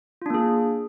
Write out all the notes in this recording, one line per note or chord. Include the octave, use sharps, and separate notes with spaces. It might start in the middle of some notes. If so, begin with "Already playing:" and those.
A#3 D4 F4 G#4